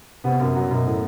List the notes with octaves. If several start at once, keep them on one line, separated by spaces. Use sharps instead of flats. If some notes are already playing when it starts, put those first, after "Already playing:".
C3 B3
F#2
F#3
F#2 B2
A2